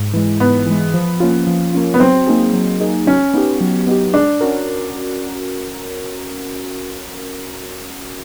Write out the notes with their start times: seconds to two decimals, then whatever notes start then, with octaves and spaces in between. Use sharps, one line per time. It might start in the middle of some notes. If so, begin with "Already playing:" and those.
Already playing: G#2
0.14 E3 G#3
0.40 G#2 B3
0.67 E3 G#3
0.94 F3
1.20 A#3 C#4 F4
1.47 F3
1.73 A#3 C#4 F4
1.94 B3
2.00 F#3 C4
2.27 A#3 D#4 G#4
2.53 F#3
2.81 A#3 D#4 G#4
3.07 F#3 C#4
3.34 B3 D#4 G4
3.61 F#3
3.87 B3 D#4 G4
4.14 G#3 D4
4.41 C#4 F#4 A#4